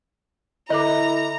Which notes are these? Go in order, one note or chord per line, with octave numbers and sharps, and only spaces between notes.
D3 E4 A4 D#5 A#5 D6